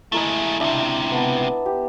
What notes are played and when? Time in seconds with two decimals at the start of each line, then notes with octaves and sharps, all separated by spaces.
0.12 G#3 A3 E4 A#4 D#5
0.60 C#2 C3 D4 E5
1.12 B3 A5
1.66 G4